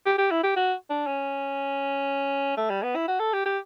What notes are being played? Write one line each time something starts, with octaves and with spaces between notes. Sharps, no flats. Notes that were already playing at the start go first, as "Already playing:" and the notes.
G4
G4
E4
G4
F#4
D4
C#4
A3
G3
B3
E4
F#4
A4
G4
G4